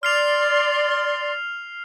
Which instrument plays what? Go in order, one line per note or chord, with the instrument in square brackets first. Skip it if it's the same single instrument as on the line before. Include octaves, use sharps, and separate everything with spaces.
[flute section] D5 C6 [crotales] F6 C7 F7